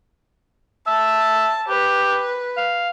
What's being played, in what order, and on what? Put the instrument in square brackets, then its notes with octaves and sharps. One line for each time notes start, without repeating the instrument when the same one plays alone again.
[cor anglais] E5 [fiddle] A5
[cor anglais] G4 [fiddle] B4
[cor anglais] F5